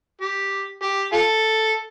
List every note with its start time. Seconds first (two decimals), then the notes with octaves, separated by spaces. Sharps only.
0.21 G4
0.82 G4
1.13 F4 A4